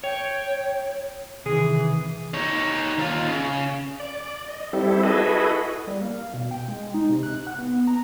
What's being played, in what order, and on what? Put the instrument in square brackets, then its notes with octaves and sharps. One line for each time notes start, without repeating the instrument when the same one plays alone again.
[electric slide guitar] C#5 [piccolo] G5
[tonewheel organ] C3 D#3 [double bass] E3 [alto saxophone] G#4
[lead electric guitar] D#4 C#5
D#2 F4
C#3
[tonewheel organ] D5
D#5
G3 C4 E4 G4 A4
E4 F#4 G#4 A4 B4 D#5
[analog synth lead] G3
A#3
F5
B2
G5
G#3
D#4
C3
F#6
F#5
B3
A#5